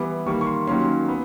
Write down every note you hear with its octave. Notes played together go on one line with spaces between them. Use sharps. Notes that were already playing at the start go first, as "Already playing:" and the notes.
Already playing: E3 G3 B3 D6
D#3 G3 A#3 C#6
C#6
C6
D#3 F#3 A#3 C#4 C6
B3